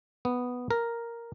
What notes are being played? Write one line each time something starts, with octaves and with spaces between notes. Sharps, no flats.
B3
A#4